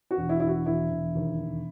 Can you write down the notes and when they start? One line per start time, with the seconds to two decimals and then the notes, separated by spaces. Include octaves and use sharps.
0.11 F#4
0.17 E1
0.29 E4
0.40 E1 E4
0.48 F#4
0.66 E1 E4
0.90 E1
1.15 D#2
1.40 E1